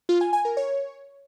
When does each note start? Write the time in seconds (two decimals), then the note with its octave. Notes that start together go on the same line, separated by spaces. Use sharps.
0.09 F4
0.21 G#5
0.33 G#5
0.45 A#4
0.57 C#5